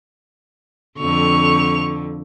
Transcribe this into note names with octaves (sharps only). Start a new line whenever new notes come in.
F2 D3 C#6 F7